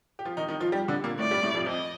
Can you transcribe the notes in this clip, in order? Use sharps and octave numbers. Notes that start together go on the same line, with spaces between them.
G4
F3 F4
D#3 D#4
D#3 D#4
F3 F4
G3 G4
D3 D4
A#2 A#3
A2 A3 D5
G2 G3
A2 A3
F2 F3
F2 F3 D#5